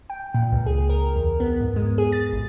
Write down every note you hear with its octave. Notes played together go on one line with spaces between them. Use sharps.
G5
A#2
C#2
G#4
A#4
E2
B3
G#2
G#3
G#4
A6
A1